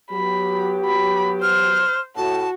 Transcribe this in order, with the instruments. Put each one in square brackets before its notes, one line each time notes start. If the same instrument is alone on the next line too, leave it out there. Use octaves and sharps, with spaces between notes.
[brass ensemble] F#3 B3 G4 [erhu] B5
[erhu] B5
[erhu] C5 [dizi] F6
[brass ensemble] A2 [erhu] F#4 [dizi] A5